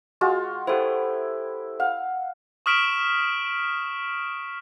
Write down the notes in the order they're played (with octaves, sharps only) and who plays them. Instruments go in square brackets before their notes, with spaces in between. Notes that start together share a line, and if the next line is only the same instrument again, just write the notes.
[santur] G#3 F4 F#4
[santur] E4 G5 [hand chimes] G4 A4 C5
[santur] F5 F#5
[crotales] C#6 D#6 F6 B6 D7 E7